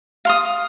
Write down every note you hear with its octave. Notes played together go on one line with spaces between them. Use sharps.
F5 C6 D#6